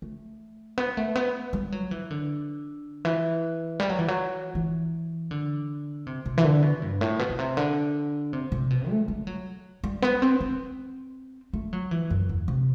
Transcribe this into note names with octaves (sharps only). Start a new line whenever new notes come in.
A3
B3
A3
B3
G3
F#3
E3
D3
E3
G3
F#3
E3
F#3
E3
D3
C3
C3
E3
D3
B2
G2
A2
B2
B2
C3
D3
C3
C3
B2
A3
G3
F#3
G3
B3
C4
C4
A3
F#3
E3
F#2
E2
C3